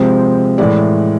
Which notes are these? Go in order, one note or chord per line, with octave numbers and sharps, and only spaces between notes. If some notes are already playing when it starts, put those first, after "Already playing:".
Already playing: C3 F3 G#3 C4
A2 E3 G#3 D5